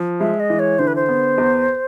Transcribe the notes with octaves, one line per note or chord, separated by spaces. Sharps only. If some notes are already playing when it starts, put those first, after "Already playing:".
Already playing: F3
G#3 E5
D#5
E3
C#5
D3 C5
B4
C5
B3
E2